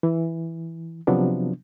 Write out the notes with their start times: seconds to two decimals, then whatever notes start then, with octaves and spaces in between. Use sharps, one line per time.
0.03 E3
1.07 C3 F3 F#3 B3 D4